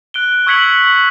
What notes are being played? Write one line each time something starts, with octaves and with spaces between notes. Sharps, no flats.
F#6 D7 G7
C#6 E6 G#6 B6 C#7 F#7